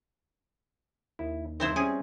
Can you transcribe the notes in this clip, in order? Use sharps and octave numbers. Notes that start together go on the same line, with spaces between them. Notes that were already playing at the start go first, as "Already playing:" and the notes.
D#2 E4
G2 C3 D#3 C4 E4 C5
G3 C4 C#4 G#4